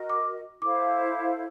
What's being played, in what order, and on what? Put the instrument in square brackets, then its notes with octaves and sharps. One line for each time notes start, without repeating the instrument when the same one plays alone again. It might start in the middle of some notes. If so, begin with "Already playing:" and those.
Already playing: [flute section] F#4 A#4 D#5
[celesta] D6
[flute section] E4 A4 C5 F5 [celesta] D6